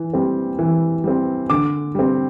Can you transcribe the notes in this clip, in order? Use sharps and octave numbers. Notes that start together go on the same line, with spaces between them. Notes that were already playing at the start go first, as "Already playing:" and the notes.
Already playing: E3
G3 C4
E3
G3 C4
D3 D6
G3 C4